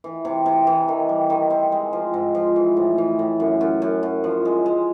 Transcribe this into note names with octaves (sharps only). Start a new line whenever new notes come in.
E3
C3
C3
E3
D#3
G3
D#3
C4
G#3
F3
G#2
F3
E3
A2
E3
A2
F#2
F#2
F#2
F#2
F3
G#3
G#3